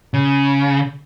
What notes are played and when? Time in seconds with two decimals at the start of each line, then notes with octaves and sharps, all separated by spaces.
0.14 C#3